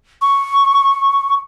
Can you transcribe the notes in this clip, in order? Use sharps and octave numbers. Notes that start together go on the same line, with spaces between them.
C#6